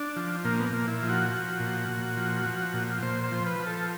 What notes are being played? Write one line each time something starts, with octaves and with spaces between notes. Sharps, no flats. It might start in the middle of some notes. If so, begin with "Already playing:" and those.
Already playing: D4
F3
A#2 A#3
B3
A#3
A#2
E4
F3
F#4
F3
A#2
A#2
F3
F3
A#2
A#2 C5
C5
F3
B4
F3
A4